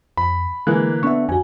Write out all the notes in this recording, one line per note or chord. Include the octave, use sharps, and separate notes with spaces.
F2 B5
D3 E3 G#3 A#3 F#6
D3 B3 E5 C#6
F2 F#4 G#5